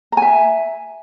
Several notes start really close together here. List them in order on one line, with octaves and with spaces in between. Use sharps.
A#5 G#5 E5